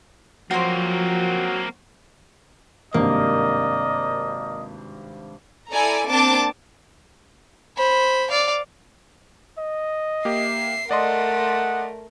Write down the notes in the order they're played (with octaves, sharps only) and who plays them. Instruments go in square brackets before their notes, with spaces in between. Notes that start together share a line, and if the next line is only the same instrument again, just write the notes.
[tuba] F3 [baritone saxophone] F#3 [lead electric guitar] A#3 C4 [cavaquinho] F#4 C5
[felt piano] G#1 G2 C3 [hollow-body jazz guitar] A#3 [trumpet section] A#4 D5 D#5
[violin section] E4 A4 D5 G#5 A#5
A#3 C4 D4 A5 D6
[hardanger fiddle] C5 B5
D5 F5
[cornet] D#5
[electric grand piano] A#3 G4 [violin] E5 C7
[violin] A3 A#4 [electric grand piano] D5 D#5 C6 [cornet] F#5